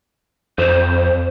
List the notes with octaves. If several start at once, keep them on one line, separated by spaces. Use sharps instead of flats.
F2 C5